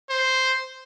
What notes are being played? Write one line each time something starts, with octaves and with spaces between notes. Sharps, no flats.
C5